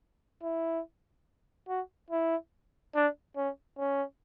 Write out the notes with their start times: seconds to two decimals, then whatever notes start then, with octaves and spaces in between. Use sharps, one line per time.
0.43 E4
1.68 F#4
2.11 E4
2.95 D4
3.37 C#4
3.78 C#4